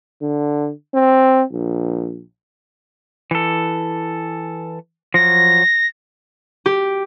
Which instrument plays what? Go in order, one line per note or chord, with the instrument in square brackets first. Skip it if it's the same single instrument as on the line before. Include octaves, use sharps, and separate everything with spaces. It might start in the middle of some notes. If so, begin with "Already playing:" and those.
[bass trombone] D3
C4
A#1
[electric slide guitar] E3 A4
[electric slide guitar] F3 F#3 [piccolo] A#6
[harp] G4